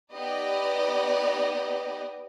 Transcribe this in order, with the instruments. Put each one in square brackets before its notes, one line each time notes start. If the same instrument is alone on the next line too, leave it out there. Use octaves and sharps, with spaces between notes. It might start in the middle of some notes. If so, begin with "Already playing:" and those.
[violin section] B3 D#4 G4 D5 D#5